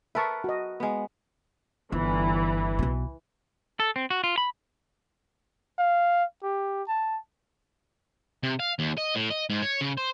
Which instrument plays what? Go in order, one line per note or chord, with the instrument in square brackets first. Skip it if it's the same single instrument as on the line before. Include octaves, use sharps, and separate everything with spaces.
[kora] A#4 B4 [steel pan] E5 A5 C#6
[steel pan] F#4 D#5
[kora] G#3 B3
[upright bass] G1 [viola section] E3
[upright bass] B1 B2
[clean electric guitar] A4
C4
F#4
F4
B5
[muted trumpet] F5
G4
A5
[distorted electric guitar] C3
F5
D#2
D#5
A2
D#5
G#2
C#5
C#3
C5